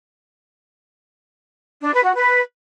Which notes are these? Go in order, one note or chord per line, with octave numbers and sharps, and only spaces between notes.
D4
B4
F#4
B4